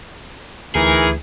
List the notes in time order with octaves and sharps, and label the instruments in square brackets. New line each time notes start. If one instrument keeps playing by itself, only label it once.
[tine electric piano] D2 [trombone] E3 [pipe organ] D#4 A#4 [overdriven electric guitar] G#4